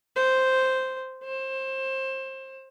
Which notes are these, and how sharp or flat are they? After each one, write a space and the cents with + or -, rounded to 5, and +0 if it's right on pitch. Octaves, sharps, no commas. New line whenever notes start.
C5 -5
C5 +25